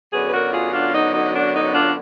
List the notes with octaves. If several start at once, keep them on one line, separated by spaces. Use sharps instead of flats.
F#2 D3 F#3 B3 G#4 B4
B4
F#4 A#4
F4 G#4
D4 F4
D#4
D#4
D4
D#4
D4 F4